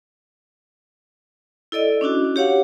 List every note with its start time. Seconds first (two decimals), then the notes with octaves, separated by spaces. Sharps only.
1.72 E4 A4 D5 D#5
2.01 C#4 D4 E4 F#4
2.36 G4 C#5 F5 F#5